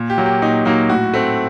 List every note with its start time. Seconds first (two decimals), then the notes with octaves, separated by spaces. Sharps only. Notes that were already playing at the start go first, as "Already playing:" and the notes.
Already playing: A#2
0.10 G4
0.18 F#3 A#3
0.26 G4
0.42 A#2 D#4
0.65 F#3 A#3 D#4
0.90 A2 F#4
1.14 A3 C4